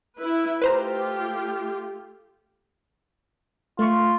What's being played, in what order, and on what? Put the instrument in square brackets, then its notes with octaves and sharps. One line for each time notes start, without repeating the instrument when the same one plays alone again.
[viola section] E4 B4
[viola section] A3 F4 G4 [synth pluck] B4 C5 A#5
[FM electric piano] A3 C#6 [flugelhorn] F4